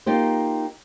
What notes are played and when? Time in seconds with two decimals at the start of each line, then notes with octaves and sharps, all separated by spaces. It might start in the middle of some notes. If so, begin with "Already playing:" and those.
0.06 A#3 D#4 F4 G4 C5